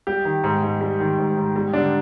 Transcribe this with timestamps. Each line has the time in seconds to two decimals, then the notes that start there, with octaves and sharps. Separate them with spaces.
0.07 G3 G4
0.25 D#3
0.44 G#2
0.63 G#2
0.81 G3
1.00 D#3
1.18 G#2
1.37 G#2
1.56 G3
1.73 D3 D4